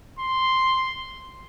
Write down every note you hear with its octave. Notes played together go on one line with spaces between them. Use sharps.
C6